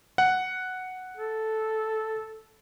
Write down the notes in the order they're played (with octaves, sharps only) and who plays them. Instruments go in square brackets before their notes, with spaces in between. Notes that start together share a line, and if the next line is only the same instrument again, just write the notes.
[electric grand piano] F#5
[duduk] A4